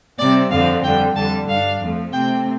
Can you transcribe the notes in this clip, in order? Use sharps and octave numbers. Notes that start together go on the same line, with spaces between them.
C3 G3 C4 D5
F2 D3 F3 C4 F5
F2 D3 G3 G5
F2 D3 G3 A5
G2 G3 D4 F5
F2 F3 A3
C3 A3 C4 G5